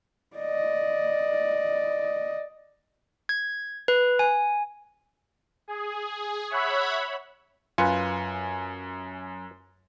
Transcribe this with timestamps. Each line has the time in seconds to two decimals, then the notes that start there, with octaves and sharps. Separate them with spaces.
0.37 D5 D#5
3.29 G#6
3.88 B4
4.19 G#5
5.68 G#4
6.50 C#5 E5 F#5 B5
7.78 F#2 F4 B4 G#5 C#7